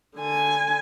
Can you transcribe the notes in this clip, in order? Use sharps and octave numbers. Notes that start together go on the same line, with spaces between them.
D3 G#5